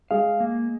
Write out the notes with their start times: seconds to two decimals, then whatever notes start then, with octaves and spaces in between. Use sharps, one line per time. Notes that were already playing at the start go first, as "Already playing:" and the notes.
0.11 G#3 G#4 F5
0.40 A#3